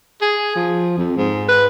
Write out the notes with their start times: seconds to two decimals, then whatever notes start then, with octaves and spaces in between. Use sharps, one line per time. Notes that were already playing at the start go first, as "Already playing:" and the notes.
0.21 G#4
0.55 F3
0.97 F2
1.17 G#2
1.49 B4